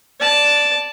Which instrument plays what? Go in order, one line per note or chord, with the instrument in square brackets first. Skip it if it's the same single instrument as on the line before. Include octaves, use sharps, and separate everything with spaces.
[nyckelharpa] D5 A5